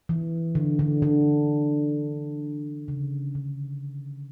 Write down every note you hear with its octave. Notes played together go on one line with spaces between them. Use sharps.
E3
D3
D3
D3
C#3
D3